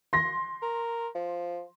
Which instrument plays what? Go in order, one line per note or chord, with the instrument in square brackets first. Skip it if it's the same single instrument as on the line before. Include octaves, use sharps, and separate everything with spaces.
[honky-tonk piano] C6 A#6
[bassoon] A#4
F3